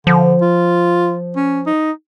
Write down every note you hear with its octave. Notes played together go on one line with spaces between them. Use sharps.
D3 F3
F4
C#4
D#4